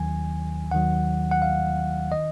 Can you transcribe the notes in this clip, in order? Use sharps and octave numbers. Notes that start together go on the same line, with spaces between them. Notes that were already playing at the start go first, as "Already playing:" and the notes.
Already playing: D#2 D#3 F#3 G#5
D#2 D#3 F#3 F#5
F#5
F5
D#3 D#5